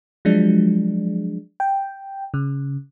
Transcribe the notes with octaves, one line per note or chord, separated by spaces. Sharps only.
F3 F#3 G#3 D4
G5
C#3